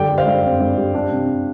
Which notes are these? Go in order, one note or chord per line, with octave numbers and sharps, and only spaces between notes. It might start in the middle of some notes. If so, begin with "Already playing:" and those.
Already playing: G2 D3 D5 G5
G3
C5 F5
G2
C4
G2
G3
D4
C3